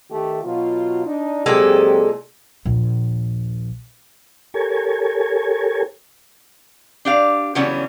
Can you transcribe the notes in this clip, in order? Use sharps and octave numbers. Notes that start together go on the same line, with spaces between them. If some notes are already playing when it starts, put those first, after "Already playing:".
D#3 A3 G4
B2 F#3 F4
D4 D#4
A#2 F#3 G#3 C4 G4 A4
A#1 D#2
G4 A4 A#4 C#5 G#5
D4 G4 F5
C#3 E3 F#3 G3 B3 C#4